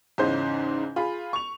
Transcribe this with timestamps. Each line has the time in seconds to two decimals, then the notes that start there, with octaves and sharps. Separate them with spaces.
0.18 E2 G#2 C#3 D#4 C5 G6
0.96 F4 G#4 B5
1.33 C#6 F7